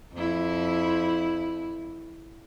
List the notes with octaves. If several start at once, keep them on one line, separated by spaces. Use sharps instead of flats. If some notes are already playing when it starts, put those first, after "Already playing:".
F2 E4